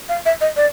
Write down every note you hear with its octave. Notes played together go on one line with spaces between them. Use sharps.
F5
E5
D#5
D5